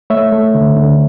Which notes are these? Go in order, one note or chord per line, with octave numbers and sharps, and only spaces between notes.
A3 C#5 E5
A3
D3
D3